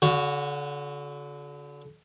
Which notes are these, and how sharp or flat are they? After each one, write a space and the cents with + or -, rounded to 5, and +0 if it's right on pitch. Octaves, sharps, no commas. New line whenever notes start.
D3 -35 F#4 +0